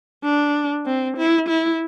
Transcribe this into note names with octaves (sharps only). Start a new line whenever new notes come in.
D4
C4
E4
E4